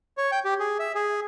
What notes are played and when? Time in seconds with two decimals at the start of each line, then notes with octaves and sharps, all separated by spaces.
0.18 C#5
0.32 G5
0.45 G4
0.60 G#4
0.80 E5
0.95 G#4